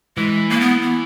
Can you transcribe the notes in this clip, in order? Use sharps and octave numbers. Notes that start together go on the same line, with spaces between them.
E3 G#3
A#3
B3
B3